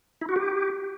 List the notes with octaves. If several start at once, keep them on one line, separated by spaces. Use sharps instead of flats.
E4
F#4
G4